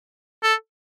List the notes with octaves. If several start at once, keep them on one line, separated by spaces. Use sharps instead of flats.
A4